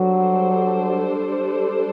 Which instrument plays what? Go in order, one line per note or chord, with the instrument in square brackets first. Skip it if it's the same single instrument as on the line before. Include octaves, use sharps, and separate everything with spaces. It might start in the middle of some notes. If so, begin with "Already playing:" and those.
Already playing: [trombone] F#3 [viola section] G3 D4 A4 C5